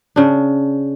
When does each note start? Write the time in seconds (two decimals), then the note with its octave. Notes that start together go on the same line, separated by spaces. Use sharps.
0.16 C#3 D4